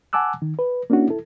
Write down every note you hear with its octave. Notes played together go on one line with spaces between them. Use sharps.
F#5 G#5 A5 D6 E6 F#6
D#3
B4
A#3 C#4 D4 E4 F#4
E4 A4